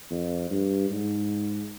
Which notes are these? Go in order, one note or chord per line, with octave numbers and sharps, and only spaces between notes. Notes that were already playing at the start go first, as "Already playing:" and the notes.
F2
G2
G#2